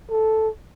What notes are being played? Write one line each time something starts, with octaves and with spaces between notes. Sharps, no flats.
A4